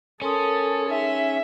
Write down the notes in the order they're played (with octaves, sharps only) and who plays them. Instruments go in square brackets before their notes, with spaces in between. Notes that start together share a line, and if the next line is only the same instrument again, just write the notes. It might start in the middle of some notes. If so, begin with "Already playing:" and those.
[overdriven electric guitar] C#4 [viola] A4 [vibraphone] A#4 C6 D#6
[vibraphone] D#4 G#4 G#5 [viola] E5